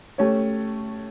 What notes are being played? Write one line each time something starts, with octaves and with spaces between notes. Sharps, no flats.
A3 C#4 G4 C#5